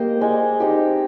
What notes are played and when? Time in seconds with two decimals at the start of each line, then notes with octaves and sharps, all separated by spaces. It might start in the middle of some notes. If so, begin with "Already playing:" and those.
Already playing: A#3 G4 C5 D#5
0.21 G#3
0.60 C4 D#4 G4